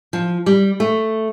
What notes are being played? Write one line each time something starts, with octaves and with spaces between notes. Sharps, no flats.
F3
G3
A3